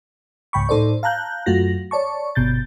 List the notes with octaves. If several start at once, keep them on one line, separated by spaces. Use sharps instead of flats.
C#2 G#2 G5 B5 C#6
A2 D#4 A4 C5 D5
F5 A5 A#5 F#6 G6
F#2 A3 F4 F#4 A#6
C#5 D5 A5 C#6
G1 B2 G6 A6